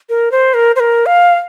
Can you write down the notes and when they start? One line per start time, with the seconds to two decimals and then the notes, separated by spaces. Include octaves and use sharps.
0.10 A#4
0.32 C5
0.54 A#4
0.76 C5
0.80 A#4
1.06 F5